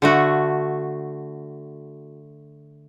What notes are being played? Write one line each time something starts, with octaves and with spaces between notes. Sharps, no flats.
D3 A3 F#4